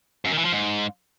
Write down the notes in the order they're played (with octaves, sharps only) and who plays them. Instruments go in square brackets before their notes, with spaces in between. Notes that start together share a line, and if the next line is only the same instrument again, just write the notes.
[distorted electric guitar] F#2
D#3
E3
F3
G#2